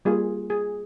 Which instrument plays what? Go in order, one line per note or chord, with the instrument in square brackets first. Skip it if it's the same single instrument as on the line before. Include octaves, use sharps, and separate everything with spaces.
[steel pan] G3 A#3 F4 G#4
G#4